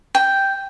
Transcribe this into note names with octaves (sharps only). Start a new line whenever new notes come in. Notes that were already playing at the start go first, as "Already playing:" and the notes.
G5